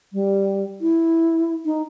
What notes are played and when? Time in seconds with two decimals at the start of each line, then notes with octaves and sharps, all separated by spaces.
0.13 G3
0.81 E4
1.65 D#4